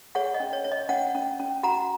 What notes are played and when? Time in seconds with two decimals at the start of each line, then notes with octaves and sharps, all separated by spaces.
0.15 G#4 C#5 F#5
0.34 D#5
0.40 C#4
0.53 C#5
0.64 C#5
0.72 D#5
0.89 C#4 C#5 F#5
1.15 C#4
1.40 C#4
1.63 F#4 F#5 A#5